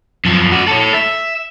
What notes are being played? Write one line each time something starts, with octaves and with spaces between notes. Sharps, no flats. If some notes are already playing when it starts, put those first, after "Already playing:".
F#2 F3
F#4 D5
A4 C#5
E5